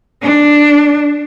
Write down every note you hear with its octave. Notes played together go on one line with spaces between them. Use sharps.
D4